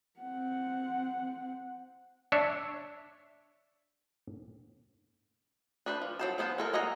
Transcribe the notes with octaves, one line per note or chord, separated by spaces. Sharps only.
C4 F#5
D4 C#5 E5
D4 B4 C5
F3
F#3 C5 A5
F3 B3 C5 A5
G#3 A4 A#4
A#3 D#5 F#5 G#5 A#5